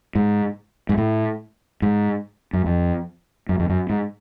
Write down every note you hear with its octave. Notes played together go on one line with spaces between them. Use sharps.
G#2
G#2
A2
G#2
F#2
F2
F#2
F2
F#2
G#2